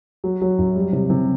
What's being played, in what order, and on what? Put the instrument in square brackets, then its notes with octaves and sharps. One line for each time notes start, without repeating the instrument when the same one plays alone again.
[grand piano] F#3
F#3
F#2
G3
C3
C3